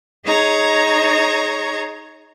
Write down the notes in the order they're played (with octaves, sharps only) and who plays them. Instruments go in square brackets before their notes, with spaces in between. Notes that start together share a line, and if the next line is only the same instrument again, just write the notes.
[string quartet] D#4 G#4 C#5 A#5 G#6